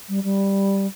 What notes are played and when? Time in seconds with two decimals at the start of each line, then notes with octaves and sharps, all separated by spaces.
0.08 G3
0.23 G3